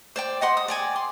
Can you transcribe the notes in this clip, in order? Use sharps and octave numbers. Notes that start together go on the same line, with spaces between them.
C5 D5 G5
D#5 F#5 C6
D#6
D5 G5 G#5
C6